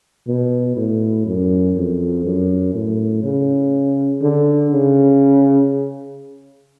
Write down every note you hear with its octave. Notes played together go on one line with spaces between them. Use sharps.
B2
A2
F#2
F2
F#2
A2
C#3
D3
C#3